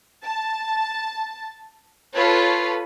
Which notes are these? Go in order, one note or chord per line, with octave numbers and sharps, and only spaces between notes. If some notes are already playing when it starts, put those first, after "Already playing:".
A5
F4 A4 B4 C#5